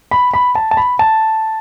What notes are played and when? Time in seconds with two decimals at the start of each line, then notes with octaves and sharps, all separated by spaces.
0.11 B5
0.34 B5
0.55 A5
0.71 A5
0.77 B5
0.99 A5